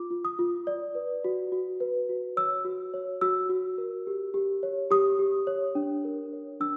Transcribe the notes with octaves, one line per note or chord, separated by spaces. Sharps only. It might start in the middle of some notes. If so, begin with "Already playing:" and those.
Already playing: F4 D6
F4
D#6
F4
D5
B4
F#4
F#4
B4
F#4
C#5 E6
F#4
C#5
F#4 E6
F#4
A#4
G4
G4
C#5
G4 D#6
G4
C#5
D4
A#4
C#5
D4 E6